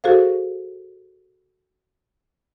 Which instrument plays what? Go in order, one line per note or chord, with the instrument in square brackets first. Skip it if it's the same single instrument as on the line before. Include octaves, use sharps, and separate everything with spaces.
[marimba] F#4 G#4 A4 C5 F5